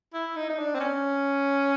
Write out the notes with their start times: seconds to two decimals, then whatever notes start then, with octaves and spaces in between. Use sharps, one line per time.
0.14 E4
0.36 D#4
0.50 D#4
0.59 D4
0.75 C4
0.80 C#4